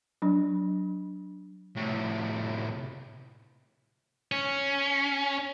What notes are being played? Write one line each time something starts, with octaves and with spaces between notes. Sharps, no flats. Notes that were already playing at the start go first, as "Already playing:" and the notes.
F#3 D4
A2 C3
C#4